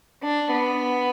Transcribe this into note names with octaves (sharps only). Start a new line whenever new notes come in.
D4
B3